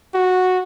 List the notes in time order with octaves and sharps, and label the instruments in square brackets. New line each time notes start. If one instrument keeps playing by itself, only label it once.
[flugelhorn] F#4